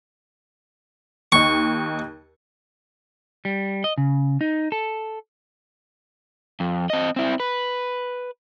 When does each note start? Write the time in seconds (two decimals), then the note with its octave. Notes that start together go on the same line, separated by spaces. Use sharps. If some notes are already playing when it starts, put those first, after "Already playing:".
1.32 D#2 D#4 C#6
3.45 G3
3.84 D#5
3.98 C#3
4.41 D#4
4.72 A4
6.60 F2
6.90 C4 D#5
7.16 C4 E4
7.40 B4